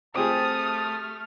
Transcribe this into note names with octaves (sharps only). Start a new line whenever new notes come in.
A3 C4 G4 G#4 A5 D#6 F6